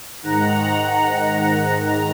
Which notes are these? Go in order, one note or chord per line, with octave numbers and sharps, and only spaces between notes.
G#2 D#3 F#5 A#5
A#5